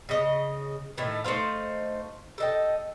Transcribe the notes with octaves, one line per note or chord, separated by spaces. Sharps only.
C#3 D#5
A2 D#3 A3
A3 D#4 C5 F5
A4 D#5 G5